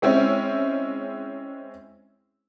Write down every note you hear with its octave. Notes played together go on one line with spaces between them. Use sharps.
G#3 C4 C#4 E4